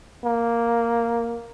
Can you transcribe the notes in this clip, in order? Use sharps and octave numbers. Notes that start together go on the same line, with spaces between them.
A#3